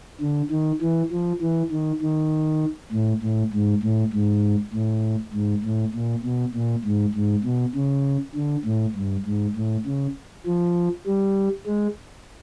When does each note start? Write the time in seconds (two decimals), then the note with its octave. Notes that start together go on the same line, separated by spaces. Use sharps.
0.21 D3
0.51 D#3
0.82 E3
1.12 F3
1.41 E3
1.71 D#3
2.02 D#3
2.92 A2
3.22 A2
3.53 G#2
3.83 A2
4.13 G#2
4.74 A2
5.33 G#2
5.64 A2
5.94 A#2
6.24 B2
6.54 A#2
6.84 G#2
7.14 G#2
7.44 B2
7.75 C#3
8.35 D3
8.65 A2
8.96 G2
9.26 G#2
9.56 A2
9.86 C#3
10.46 F3
11.06 G3
11.67 G#3